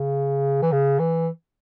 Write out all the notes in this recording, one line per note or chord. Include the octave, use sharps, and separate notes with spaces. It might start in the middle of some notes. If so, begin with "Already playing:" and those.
Already playing: C#3
E3
C#3
E3